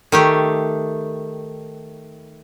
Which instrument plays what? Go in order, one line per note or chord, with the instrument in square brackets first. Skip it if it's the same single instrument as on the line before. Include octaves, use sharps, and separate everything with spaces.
[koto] D#3 A3 G4